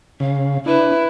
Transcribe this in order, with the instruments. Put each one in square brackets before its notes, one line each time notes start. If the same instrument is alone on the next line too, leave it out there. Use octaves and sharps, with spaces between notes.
[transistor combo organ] C#3 [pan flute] F5
[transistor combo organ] D4 [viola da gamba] E4 [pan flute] B4